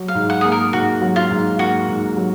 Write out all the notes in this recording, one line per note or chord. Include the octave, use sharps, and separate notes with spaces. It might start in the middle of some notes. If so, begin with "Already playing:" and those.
Already playing: F#3
F5
G#2
F#5
A#3 G#4
A#4
G#2 F#4
F#3
F4
G#2
A#3 F#4
G#2
F#3